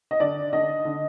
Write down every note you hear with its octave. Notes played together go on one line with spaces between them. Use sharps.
D#5
D3 D5
D3 D#5
D3